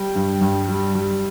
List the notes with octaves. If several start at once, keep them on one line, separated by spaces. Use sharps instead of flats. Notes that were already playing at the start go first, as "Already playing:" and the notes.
Already playing: G3 G5
G2
G2
G3
G3